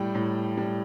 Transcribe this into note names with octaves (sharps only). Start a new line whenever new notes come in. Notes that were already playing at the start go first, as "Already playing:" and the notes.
Already playing: A2 G3 G5
A2
G3